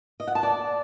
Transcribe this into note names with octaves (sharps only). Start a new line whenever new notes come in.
D#5
F#5
A5
D5